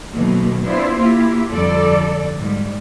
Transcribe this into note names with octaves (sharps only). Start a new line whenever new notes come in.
B2 D#3 F#3 A3 A#3 C4
B3 C4 D4 E4 F4 C5
A#3 E4 F4 G4
F2 D3 G3 A4 D5
G#2 G3